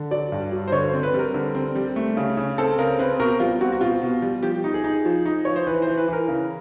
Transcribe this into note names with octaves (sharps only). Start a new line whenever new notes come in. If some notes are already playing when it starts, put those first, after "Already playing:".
Already playing: D3
F#3 D5
G2
F#3
C5
D3 C#5
C5
C4
B4
G3 A#4
D3
C4
G3
A3
C#3
C#3
C4 A4
C#3 A#4
C4 B4
B2 A#4
G3 F4
C4 F#4
F#4
B2 F4
B2
G3
F3 G4
D#4
G#4
D#4
F3
D#4
F3 C#5
C5
E3 B4
E3 C5
B4
E3 A#4
C#3